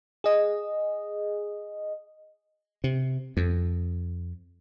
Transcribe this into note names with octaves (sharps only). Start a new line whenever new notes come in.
G#4 D#5
C3
F2